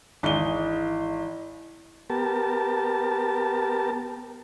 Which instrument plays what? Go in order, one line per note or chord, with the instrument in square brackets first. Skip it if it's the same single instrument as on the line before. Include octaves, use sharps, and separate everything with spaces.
[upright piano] G#1 G7 [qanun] E3 G#3
[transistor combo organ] B3 G4 A#4 A5